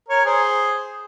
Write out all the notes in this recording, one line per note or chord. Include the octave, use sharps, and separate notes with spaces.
A#4 C#5
G#4 C5